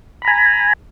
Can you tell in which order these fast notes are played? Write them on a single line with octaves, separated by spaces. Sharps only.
B5 A#5 G#5